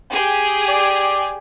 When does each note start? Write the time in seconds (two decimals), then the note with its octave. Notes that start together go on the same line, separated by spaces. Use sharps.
0.11 G4 G#4
0.68 D5